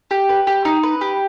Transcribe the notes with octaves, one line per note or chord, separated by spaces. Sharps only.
G4
B4
G4
D#4
B4
G4